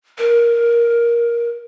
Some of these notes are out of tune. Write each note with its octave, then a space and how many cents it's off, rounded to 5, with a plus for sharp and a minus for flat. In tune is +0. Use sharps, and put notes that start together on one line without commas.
A#4 +10